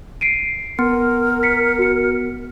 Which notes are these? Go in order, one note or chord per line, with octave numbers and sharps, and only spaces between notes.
C7 D7 D#7
B3 A#4
B6 C#7
F#4 C#7